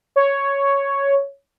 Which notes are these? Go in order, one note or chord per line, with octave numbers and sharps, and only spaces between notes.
C#5